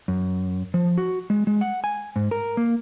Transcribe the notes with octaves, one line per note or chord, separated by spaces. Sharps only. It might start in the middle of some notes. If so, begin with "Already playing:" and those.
F#2
F3
F#4
G#3
G#3
F#5
G#5
G#2
A#4
A#3